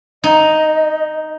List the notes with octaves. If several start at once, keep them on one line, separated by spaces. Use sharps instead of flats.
D#4 D#5